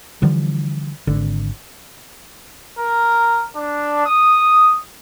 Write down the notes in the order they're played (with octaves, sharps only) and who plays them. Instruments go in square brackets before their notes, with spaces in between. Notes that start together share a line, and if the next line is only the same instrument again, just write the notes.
[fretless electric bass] D3 E3 F3 G3
G#1 D3
[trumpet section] A#4
D4
D#6